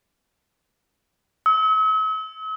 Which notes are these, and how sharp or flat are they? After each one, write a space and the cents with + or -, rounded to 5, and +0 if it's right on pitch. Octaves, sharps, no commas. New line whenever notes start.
E6 -45